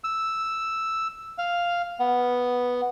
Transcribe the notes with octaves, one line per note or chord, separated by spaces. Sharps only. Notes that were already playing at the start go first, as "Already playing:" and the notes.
E6
F5
B3